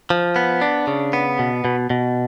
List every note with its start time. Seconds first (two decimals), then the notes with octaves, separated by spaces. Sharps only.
0.10 F3
0.36 B3
0.61 D4
0.87 C#3
1.13 B3
1.39 B2
1.65 B2
1.90 B2